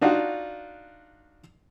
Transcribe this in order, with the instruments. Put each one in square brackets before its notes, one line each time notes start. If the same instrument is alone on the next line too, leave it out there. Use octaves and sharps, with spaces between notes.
[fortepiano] D4 D#4 F4 F#4